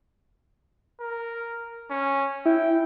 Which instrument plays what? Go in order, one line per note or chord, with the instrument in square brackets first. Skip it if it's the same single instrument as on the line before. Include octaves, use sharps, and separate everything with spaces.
[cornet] A#4
C#4
[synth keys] E4 [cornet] G5